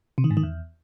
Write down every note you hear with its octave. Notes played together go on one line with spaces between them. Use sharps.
C3
D#3
G#2
D#3
E2